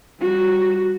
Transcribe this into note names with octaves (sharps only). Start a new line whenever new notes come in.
G3 F#4